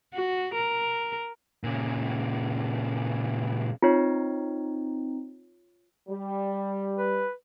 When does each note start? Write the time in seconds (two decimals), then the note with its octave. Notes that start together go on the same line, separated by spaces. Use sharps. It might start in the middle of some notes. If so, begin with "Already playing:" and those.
0.14 F#4
0.54 A#4
1.64 A#2 C#3
3.82 C4 D#4 F4 C#5
6.09 G3
6.97 B4